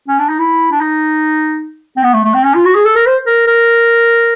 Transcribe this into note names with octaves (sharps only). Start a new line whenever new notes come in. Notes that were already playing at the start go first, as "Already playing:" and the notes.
C#4
D4
D#4
E4
D4
D#4
C4
B3
A3
A3
C4
C#4
F4
F#4
G#4
A4
A#4
C5
A#4
A#4